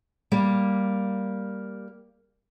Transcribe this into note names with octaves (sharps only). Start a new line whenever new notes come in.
G3 A#3